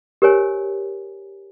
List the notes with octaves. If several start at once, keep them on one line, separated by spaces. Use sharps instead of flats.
G4 A#4 C5 C#5 G#5